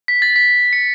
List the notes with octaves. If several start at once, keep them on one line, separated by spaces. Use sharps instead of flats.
B6
A6
B6
C#7